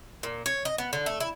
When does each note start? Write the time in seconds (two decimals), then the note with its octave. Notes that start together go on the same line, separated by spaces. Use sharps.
0.23 A#2
0.46 C#5
0.65 D#5
0.78 B3
0.93 D3
1.06 A3
1.20 E4